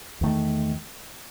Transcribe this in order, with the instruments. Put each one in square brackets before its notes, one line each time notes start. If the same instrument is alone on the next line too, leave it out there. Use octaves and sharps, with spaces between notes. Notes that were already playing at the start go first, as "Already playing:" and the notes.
[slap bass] E2 D#3 A3